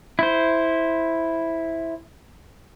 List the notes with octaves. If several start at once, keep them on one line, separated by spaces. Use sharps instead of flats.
E4 C5